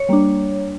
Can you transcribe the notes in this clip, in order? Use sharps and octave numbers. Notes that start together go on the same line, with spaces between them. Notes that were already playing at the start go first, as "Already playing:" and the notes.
Already playing: C#5
G3 A#3 D4